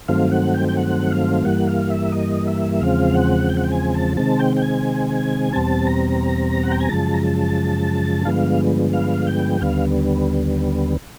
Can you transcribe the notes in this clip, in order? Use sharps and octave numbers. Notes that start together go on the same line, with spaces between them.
G2 D#3 F#3 A3 C4 F5
F#5
G5
G5
F#5
F5
G2 E3 G3 A#3 F#5
F5
E5
D#5
E5
E2 C#3 F3 G#3 C4 F5
F#5
G5
F#5
G5
G#5
A5
C3 D#3 G#3 C4 A5
G5
G5
G#5
E2 B2 G3 C4 A5
A#5
F#5
G5
G#5
F#2 C#3 F3 G#3 A5
A#5
A5
G2 D3 F3 G#3 B3 F5
F5
G5
D#2 D3 G3 B3 F5